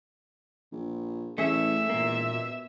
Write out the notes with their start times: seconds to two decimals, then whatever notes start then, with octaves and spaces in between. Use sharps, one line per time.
0.72 A#1
1.38 A1 A3 G#4 E5
1.89 E1 A#2 A#3
2.31 B2